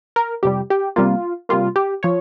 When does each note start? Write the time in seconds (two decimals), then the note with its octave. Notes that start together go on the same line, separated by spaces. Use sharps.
0.16 A#4
0.43 F2 C3 G3 G4
0.70 G4
0.96 C3 G3 A#3 F4
1.49 C3 G3 A#3 F4
1.76 G4
2.03 F3 C#5